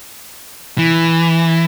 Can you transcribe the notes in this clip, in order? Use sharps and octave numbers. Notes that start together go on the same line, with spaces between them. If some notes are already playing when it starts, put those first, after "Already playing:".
E3